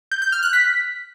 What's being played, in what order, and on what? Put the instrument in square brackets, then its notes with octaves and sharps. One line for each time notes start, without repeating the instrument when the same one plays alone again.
[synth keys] G6
G6
F6
F#6
B6